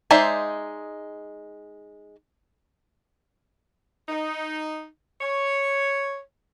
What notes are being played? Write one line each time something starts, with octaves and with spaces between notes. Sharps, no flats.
G#3 D#4 C5 D5 E5
D#4
C#5